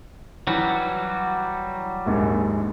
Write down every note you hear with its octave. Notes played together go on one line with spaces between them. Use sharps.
E3 F#3 G3 E4 F#4
A#1 D#2 G#2